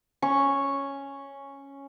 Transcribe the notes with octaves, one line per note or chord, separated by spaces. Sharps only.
C#4 C#6